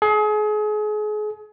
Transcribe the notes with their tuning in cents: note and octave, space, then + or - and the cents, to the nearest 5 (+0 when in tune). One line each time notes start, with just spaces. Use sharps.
G#4 +35